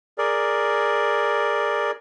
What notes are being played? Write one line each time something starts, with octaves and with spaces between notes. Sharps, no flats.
G#4 A#4 D5